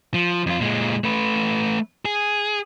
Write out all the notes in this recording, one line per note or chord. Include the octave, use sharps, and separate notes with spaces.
F3
F2 F4
A#2 G#3
A3 B4
G#4